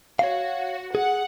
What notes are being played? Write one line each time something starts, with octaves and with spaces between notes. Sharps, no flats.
F#4 C#5 F5
G#4 F#5